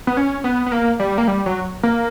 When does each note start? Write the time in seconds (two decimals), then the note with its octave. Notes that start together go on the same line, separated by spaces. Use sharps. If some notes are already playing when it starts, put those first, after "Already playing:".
0.07 B3
0.17 C#4
0.44 B3
0.66 B3
0.72 A#3
1.00 G3
1.18 A#3
1.28 G3
1.46 F#3
1.83 A#3